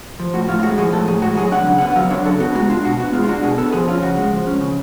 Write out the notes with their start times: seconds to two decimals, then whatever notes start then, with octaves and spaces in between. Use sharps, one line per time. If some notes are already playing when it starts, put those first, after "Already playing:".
0.19 F3
0.34 A2 F#4
0.48 A2 F4
0.60 F4
0.63 G#3 F#4
0.78 F3 G#4
0.93 A2 A4
1.08 A2 G#4
1.22 G#3 F#4
1.37 F#3 G#4
1.52 D4 F#5
1.66 C#3
1.78 F#5
1.81 B3
1.96 F#3 F5
2.10 D4 C#5
2.25 C#3 A4
2.40 B3 F#4
2.55 G#3 F#4
2.70 D4 F4
2.84 B2 F#4
3.00 B3
3.13 G#3 F4
3.24 F4
3.28 D4 F#4
3.43 B2 G#4
3.58 B3 A4
3.72 F3 G#4
3.87 C#4 F4
4.02 C#3 F#4
4.17 G#3
4.32 F3
4.47 C#4
4.61 C#3